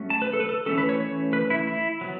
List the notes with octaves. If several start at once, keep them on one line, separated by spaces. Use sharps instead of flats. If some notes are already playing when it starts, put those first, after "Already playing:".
Already playing: F#3 A3 C#4
A5
B4
A4
B4
A4
E3 A3 C#4 A4
B4
C#5
C#5
B4
E4
E4
F#3 B3